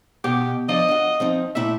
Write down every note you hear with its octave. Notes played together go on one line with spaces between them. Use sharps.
B2 G4
F3 D4 D5 D#5
F4 F#4
F3 C4 D#4
A#2 A3 E4 E5